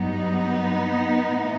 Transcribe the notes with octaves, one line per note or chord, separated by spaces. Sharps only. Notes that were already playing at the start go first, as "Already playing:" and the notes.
Already playing: G2 F#3 B3 D#4
A2 E3